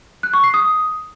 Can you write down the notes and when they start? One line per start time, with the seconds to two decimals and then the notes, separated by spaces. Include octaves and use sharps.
0.23 F#6
0.33 C#6
0.44 C7
0.54 D#6